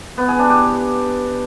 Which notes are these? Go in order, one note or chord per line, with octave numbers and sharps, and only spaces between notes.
B3
G#4
D4
G4